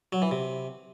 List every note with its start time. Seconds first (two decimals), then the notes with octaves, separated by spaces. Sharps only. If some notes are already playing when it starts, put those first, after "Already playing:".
0.12 F#3
0.22 E3
0.31 C3